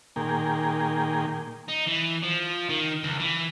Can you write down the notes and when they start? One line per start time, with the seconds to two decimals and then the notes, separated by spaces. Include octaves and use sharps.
0.16 A#2 D#3 A#3 G#4 G5
1.68 D#4
1.87 E3
2.23 F3
2.69 D#3
3.03 C#2
3.20 E3